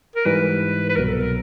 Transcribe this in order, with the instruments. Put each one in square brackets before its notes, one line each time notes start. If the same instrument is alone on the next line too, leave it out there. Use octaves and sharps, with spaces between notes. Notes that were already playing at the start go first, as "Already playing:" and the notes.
[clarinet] A#4
[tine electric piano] G#2 E3 G3 [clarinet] B4
[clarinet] B4
[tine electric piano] C2 B2 F#3 [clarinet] A#4
[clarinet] A4
A#4